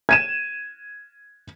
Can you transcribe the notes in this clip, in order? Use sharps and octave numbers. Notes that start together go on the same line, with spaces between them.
G#6 D#7 E7